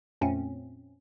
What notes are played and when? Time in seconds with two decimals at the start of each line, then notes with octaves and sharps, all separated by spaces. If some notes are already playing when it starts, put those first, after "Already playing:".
0.21 F2 A#2 A3 C4 C#4